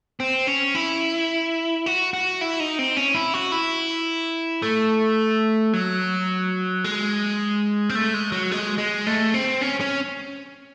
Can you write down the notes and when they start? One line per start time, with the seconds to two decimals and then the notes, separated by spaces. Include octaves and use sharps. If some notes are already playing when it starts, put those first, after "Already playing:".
0.20 C4
0.47 C#4
0.75 E4
1.86 F#4
2.13 F#4
2.41 E4
2.60 D#4
2.79 C4
2.97 C#4
3.14 E4
3.34 F#4
3.52 E4
4.62 A3
5.73 F#3
6.84 G#3
7.89 C4
7.95 A3
8.14 G#3
8.32 F#3
8.51 G#3
8.78 G#3
9.07 A3
9.34 C4
9.61 C#4
9.80 C#4